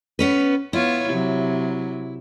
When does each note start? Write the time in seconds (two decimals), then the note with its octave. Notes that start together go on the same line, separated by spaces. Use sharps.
0.19 B3 C#4 B4
0.73 B3 E4 F4 C#5
1.10 C3 F#3